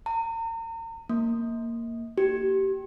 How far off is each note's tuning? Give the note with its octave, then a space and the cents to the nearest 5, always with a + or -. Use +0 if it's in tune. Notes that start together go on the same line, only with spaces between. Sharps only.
A#5 -40
A#3 -10
G4 -20